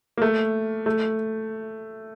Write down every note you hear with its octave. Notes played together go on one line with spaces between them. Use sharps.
A#3
A3
A3